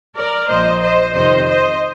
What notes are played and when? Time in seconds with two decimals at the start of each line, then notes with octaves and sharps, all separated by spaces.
0.16 A#4 D5
0.49 A#1 A#2 F3 C5 D#5
0.82 C5 D#5
1.14 F2 C3 D#3 C5 D#5
1.46 C5 D#5